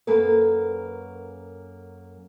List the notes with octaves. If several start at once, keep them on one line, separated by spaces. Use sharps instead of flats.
F#2 A#3 A4 B4